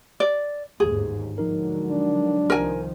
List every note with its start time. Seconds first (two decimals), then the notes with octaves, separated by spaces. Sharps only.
0.20 D5
0.80 G1 D#2 G#2 G#4
1.38 D3 F3 F#3 G#3 D#4 A#4
1.91 D4
2.50 C2 D#3 F3 A#4 G#5